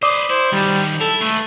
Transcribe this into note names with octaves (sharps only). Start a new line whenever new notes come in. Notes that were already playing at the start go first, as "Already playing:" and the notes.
B4 C5 D5 D6 D#6
E4 C5
D#3 F#3 G3
E4 A4 F7
G#3 A3 B4